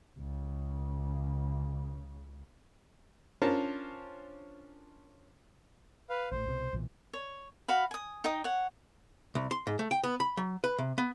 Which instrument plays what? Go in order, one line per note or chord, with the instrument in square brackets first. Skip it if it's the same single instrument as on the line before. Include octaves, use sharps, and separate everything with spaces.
[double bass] C#2 C#3
[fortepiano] C#4 D4 F4 A#4 C5 A5
[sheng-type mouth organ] B4 F5
[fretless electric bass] A1 A2 [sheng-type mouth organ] C5
[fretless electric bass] C2 B2
B1 A#2 E3
[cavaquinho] C#5
F#4 F5 B5
G#5 D#6
D#4 D#5 G5 D#6
C#5 F#5
[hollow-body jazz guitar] C2
C6
G#2
A3
G5
B3
B5
F#3
B4
C3
B3